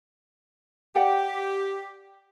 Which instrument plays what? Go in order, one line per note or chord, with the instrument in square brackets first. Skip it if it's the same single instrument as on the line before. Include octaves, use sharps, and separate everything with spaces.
[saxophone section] G4 [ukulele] D5 F#5 G5